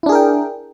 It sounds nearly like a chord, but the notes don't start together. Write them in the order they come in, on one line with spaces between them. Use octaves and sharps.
E4 D4 G#4 A#4 G5